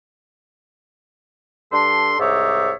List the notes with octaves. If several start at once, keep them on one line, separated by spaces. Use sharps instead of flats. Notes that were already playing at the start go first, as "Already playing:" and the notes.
G2 D4 A4 C6
C2 G#2 D#4 C#5 D5 E5